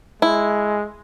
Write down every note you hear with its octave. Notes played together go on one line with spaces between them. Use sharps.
G#3 E4